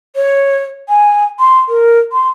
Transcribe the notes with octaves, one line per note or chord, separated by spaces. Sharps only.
C#5
G#5
C6
A#4
C6